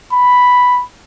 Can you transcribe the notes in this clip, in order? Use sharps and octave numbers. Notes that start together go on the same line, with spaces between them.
B5